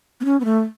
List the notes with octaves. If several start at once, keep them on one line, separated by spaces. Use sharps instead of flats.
B3
C#4
B3
A3